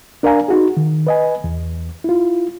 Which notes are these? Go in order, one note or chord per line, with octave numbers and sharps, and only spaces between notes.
D4 A#4 D5 F5 G#5 A#5
D#4 F#4 G#4
D#3
B4 D#5 G#5
E2
E4 F4